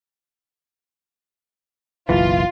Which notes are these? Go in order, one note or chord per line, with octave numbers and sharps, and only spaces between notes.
F#1 B1 E3 F4